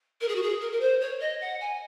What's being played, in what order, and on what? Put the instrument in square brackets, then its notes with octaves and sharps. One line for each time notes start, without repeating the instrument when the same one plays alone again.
[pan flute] A#4
G#4
F#4
G#4
A#4
A#4
C5
C#5
D#5
F#5
G#5